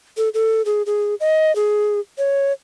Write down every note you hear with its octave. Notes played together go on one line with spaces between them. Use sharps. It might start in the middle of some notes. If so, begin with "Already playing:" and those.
A4
A4
G#4
G#4
D#5
G#4
C#5